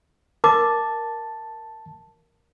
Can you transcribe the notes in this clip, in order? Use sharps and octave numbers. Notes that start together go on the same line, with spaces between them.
A#4 A5 D6